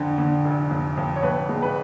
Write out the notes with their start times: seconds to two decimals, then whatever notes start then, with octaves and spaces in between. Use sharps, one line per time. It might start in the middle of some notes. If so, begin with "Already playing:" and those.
Already playing: F2 D3
0.18 D3
0.45 F1
0.71 F2
0.97 F2
1.16 C#5
1.23 F2 B4
1.49 G#3
1.62 B4